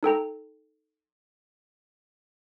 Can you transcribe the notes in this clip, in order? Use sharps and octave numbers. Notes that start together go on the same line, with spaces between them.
D#4 A4 G5 A#5